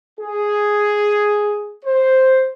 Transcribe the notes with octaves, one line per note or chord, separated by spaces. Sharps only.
G#4
C5